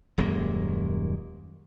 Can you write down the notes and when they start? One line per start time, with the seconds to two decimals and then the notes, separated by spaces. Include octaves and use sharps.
0.18 D#1 F#2 G#3 A#3